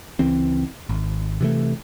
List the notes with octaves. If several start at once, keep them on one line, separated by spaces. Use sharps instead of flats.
C#2 E3 C4
G#1
C3 E3 F#3 A3